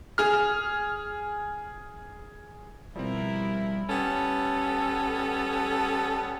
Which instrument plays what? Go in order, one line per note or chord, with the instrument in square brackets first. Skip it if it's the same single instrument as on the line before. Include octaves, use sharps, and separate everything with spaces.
[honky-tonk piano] G#4 F6
[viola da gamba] B2 A#4 [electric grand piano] F3 C4 [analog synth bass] G3 [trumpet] E4
[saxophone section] G3 B3 C#4 A4